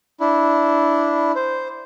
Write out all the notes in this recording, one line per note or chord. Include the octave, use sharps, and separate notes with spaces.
D4 E4
C5